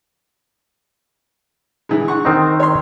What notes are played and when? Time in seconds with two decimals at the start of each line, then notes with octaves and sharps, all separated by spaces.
1.89 D3 E3 G#3
2.08 F#5 C#6
2.25 D#3 C4 D#4
2.60 C#5 C6